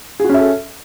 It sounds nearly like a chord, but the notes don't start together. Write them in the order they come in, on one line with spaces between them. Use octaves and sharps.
G#4 F#4 C#4 E5 A4